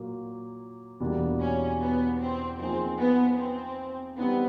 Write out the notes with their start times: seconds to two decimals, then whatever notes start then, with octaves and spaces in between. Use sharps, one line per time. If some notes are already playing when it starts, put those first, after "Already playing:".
Already playing: A#2 F#3 A#3
1.00 E2 B2 G3 A#3 D4
1.40 C#4
1.80 B3
2.20 C4
2.59 F3 A#3 C4 D#4 G#4
2.99 B3
3.38 C4
4.17 G3 B3 C4 D#4